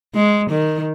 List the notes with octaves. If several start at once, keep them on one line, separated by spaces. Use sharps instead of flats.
G#3
D#3